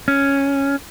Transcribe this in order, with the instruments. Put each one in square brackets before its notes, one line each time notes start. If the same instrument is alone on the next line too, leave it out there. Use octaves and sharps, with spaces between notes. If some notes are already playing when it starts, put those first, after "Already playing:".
[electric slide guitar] C#4